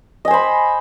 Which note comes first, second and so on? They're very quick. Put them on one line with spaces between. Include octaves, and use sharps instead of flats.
D#5 G#5 C5 B5